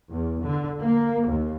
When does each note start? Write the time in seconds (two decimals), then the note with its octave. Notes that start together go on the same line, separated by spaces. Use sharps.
0.10 E2
0.42 D3
0.80 A#3
1.26 D#2